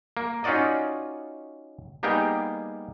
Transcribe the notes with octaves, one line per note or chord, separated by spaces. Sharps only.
A#3
C#4 D#4 F4 F#4 D5 D#5
G3 A#3 B3 D#4 G4 G#4